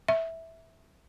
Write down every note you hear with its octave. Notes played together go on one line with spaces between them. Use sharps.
E5